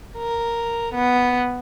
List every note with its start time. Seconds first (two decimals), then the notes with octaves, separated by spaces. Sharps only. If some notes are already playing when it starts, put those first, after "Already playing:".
0.19 A#4
0.95 B3